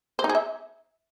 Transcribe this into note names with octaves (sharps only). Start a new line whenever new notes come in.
C5
D#4
G#4
E5